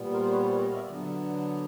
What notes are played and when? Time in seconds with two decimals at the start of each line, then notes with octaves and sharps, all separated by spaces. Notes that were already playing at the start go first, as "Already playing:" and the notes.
Already playing: A#2 G3 B3
0.12 A#4 C5
0.24 C5
0.31 B4 C#5
0.42 C#5
0.46 C5 D5
0.61 C#5 D#5
0.69 F5
0.75 D5 E5
0.89 D3 F#3 B3 D4